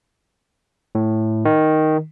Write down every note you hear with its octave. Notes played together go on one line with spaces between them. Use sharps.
A2
D#3